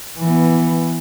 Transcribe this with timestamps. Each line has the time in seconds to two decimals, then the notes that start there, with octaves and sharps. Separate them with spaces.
0.20 E3 B3